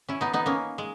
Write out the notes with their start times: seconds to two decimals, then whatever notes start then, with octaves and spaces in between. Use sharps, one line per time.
0.09 C#4 E4
0.21 B3 D#4
0.33 B3 D#4
0.46 A#3 C#4
0.78 G#3